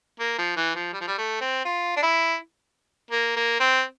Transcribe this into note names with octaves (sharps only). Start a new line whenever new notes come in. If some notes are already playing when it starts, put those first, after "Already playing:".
A#3
F3
E3
F3
G3
F3
G3
A3
C4
F4
D4
E4
A#3
A#3
C4